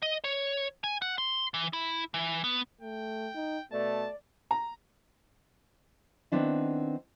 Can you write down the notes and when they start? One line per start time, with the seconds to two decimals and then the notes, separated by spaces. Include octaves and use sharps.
0.02 D#5
0.24 C#5
0.84 G#5
1.02 F#5
1.18 C6
1.54 E3
1.73 E4
2.14 E3
2.44 B3
2.81 A3 G5
3.35 D#4
3.72 B2 A3 D5 A5
4.51 A#5
6.32 D#3 B3 C4 D4 E4